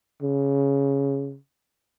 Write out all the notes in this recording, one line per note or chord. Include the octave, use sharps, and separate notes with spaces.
C#3